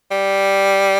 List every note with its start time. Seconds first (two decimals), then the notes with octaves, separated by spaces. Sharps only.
0.11 G3